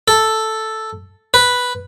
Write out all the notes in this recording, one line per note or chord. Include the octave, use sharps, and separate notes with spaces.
A4
B4